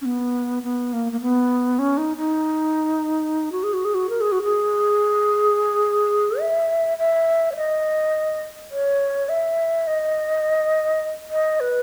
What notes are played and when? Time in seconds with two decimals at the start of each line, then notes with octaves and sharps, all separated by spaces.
0.02 C#4
0.05 B3
0.63 B3
0.93 A#3
1.12 A#3
1.21 B3
1.79 C#4
1.98 D#4
2.17 D#4
3.52 F#4
3.63 G#4
3.74 F#4
3.85 G#4
3.94 F#4
4.10 A#4
4.21 G#4
4.32 F#4
4.43 G#4
6.40 E5
6.98 E5
7.52 C#5
7.56 D#5
8.71 C#5
9.29 E5
9.87 D#5
11.31 D#5
11.60 B4